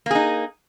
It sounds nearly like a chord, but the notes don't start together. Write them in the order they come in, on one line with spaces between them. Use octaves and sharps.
A#3 G#4 D#4